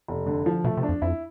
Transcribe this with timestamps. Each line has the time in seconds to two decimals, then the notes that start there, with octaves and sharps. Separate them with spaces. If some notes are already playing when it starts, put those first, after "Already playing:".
0.08 F1
0.26 D3
0.46 F3
0.64 B2 A3
0.77 C3
0.83 D4
0.89 F2
1.02 F2 E4